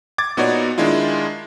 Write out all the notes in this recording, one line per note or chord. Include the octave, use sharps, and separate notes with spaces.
D6 G#6 A6
A#2 B3 D#4 F#4 C#5 D5
D#3 G#3 D4 E4 F4